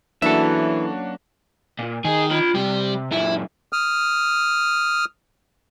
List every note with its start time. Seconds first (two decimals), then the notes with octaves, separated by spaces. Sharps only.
0.22 E3 F#3 A#3 C#4 D4 F#4 A4 E5
1.79 A#2
2.05 D#3 G#4
2.32 F4 B5
2.55 C3 G3
3.12 F#2 A#2 E4
3.73 D#6 F6